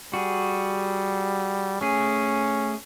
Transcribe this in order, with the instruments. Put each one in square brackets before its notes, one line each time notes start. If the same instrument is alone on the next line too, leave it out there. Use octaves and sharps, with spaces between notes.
[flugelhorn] G3 [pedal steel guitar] F#4 G#4
[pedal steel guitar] A3 G#4 [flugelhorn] C#4